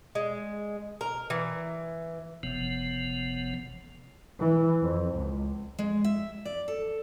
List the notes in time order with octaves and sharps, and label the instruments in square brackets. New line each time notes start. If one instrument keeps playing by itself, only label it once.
[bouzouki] G#3
A#4
E3
[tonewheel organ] F#1 C3 F3 B3
[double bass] E3
F2
C#2
[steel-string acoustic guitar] G#3
E5
D5
A4